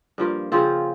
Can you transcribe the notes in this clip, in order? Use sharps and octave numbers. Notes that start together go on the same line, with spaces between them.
G2 F3 A#3
C#3 F3 C4 F4